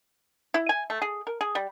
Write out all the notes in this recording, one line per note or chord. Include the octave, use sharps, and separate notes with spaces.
E4
G#5
A3
G#4
A#4
G#4
G3